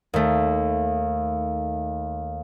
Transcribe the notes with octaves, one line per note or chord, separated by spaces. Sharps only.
D#2 A3